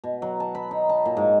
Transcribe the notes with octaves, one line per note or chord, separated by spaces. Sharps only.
B2
F#3
A5
B5
D#4
A5
A#2
G#2